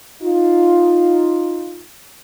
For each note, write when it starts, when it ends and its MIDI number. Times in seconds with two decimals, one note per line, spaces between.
0.23 1.84 63
0.23 1.84 65